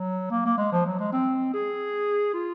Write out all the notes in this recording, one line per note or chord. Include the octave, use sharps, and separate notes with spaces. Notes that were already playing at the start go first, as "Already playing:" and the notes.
Already playing: F#3
A#3
A#3
G#3
F3
F#3
G#3
C4
G#4
F4